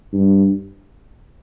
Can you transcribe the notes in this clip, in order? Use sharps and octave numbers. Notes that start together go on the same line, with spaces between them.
G2